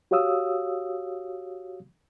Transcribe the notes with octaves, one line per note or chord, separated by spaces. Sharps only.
F#4 G4 C#5 F5 D#6 E6